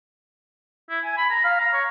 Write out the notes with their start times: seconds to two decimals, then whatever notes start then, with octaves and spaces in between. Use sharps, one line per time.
0.90 E4
1.04 G#5
1.17 B5
1.30 A#5
1.44 F5
1.60 A#5
1.74 C#5